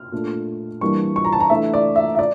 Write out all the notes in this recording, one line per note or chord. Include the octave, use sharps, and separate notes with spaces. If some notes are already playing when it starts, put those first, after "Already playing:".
Already playing: F6
A#2 A3 D4
E3 G3 A#3 D4 C#6
C#6
A#5
A5
A#5
E3 A3 D4 E5
D5
E5
E5
D5